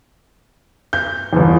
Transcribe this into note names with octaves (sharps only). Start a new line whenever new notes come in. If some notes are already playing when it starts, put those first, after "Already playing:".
G6
G1 E2